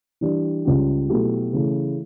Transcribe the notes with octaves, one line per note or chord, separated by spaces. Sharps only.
E3 G3 D4
C#2 C#3 G3 C#4 G4
B2 F#3 A3 E4 G4
C#3 E3 A3 E4